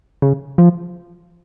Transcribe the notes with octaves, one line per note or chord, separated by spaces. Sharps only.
C#3
F3